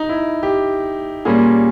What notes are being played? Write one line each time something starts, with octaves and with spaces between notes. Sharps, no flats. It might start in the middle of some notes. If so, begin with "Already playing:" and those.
Already playing: D#4
E4
G4
A#2 G3 A#3 C#4 G#4